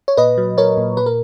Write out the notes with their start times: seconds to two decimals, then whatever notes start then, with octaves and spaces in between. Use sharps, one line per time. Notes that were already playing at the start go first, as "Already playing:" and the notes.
0.08 C#5
0.17 A#2 B4 D#5
0.38 F#3
0.57 F#3 A#4 C#5
0.77 A#2
0.97 A#2 B4
1.06 A#4